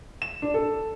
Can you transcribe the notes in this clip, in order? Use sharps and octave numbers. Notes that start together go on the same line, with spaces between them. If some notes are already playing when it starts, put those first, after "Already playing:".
E7
D4
A4